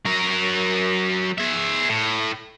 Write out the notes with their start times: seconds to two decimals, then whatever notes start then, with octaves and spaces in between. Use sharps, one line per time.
0.05 F#3 A#4
1.38 G#4 E5
1.89 A2